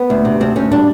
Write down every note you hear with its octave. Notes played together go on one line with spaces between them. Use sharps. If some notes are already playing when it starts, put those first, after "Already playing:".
Already playing: B3
D2
C3
D2 C4
D2 C#4
G3 D4